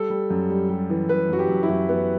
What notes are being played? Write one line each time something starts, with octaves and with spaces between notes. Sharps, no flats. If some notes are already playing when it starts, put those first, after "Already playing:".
Already playing: G3 A4
G3
F#2
G3
G3
E3
F#2 B4
F#2 F#4
G4
F#2
E4
F#2 F#4
F#2 B3